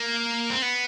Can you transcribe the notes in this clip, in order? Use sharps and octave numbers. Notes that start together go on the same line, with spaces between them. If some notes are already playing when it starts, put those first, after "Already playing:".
Already playing: A#3
C4
B3